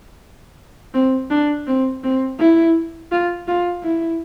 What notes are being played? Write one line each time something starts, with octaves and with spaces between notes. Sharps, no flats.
C4
D4
C4
C4
E4
F4
F4
E4